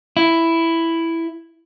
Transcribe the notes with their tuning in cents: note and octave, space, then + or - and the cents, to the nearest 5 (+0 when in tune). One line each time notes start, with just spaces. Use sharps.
E4 +5